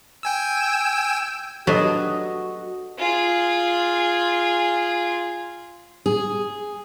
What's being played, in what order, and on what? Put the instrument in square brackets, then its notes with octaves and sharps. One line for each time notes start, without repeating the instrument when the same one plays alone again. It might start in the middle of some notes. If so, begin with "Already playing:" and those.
[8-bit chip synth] G5 G#5 E6
[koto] F#3 B3 D4 [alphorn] F#4 [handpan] G4 A4 D#5
[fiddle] F4 G#4
[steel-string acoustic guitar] G#4